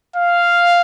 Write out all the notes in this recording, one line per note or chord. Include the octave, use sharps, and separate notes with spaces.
F5